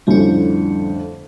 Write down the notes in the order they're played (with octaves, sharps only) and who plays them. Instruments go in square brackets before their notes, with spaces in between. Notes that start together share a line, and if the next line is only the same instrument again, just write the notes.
[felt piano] F2 A2 D3 [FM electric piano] G3 C#4